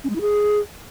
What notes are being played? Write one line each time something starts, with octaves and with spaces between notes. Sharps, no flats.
C#4
G#3
E4
G#4